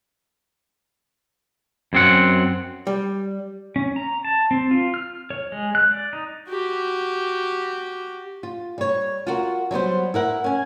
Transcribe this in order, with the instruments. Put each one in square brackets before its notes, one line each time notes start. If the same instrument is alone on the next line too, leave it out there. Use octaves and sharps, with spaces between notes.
[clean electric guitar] F#2 C4 F#5
[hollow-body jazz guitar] G3
[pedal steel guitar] C#4
A#5
A5
C4
F4
F6
C#5
G#3
F#6
D5
D#4
[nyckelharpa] F#4 G4
[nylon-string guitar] F4
G3 C#5
F4 F#4 A#4
F#3 G3 B3 C5
E4 A#4 F#5
C#4 G#5